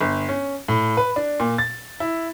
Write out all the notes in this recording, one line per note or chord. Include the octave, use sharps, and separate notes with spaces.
G1
C#4
A2
B4
D4
A#2
A6
E4